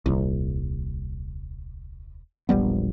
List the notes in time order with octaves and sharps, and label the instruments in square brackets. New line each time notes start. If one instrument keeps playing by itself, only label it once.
[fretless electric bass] D#1 C2
E1 A#1 G3 B3